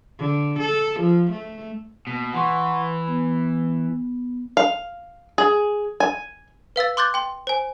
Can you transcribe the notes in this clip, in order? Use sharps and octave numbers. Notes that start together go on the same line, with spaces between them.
D3
A4
F3
A3
B2 A#3
E3 F#5 C6 C#6
B3
F5
G#4
G#5
B4 F5 E6 A6
C6 D6 F#6 G6 A6
G5 C6
C5 G#5